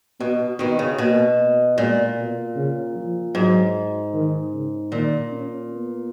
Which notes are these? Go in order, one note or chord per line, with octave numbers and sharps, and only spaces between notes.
B2 B3
B2 D#3 B3
C#3
B2 A#3
A#2 G#3
B2
C#3
F3
G#2 F#3
D#3
C#3
A#2 D#3
C#4
B3